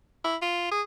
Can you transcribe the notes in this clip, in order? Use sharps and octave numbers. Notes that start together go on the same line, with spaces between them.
E4
F4
G#4